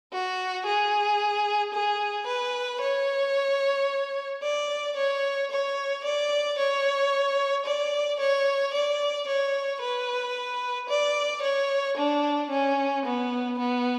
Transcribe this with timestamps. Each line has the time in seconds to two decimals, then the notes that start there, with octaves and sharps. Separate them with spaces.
0.12 F#4
0.65 G#4
1.74 G#4
2.27 B4
2.81 C#5
4.43 D5
4.96 C#5
5.51 C#5
6.04 D5
6.59 C#5
7.65 D5
8.20 C#5
8.73 D5
9.27 C#5
9.82 B4
10.89 D5
11.42 C#5
11.97 D4
12.50 C#4
13.05 B3
13.58 B3